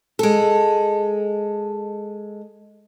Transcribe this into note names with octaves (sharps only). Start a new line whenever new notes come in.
G#3 A4